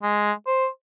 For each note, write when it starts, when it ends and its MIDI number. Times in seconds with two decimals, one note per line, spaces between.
0.02 0.32 56
0.47 0.67 72